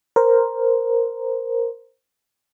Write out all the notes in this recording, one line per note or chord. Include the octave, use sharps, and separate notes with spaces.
A#4 C5